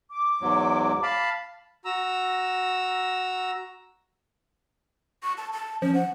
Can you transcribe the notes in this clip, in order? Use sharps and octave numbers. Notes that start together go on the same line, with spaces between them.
D6
E2 G#2 F#3
F5 A5 B5
F#4 A#5 E6
C#6
A5
A5
F3 C#4
F#5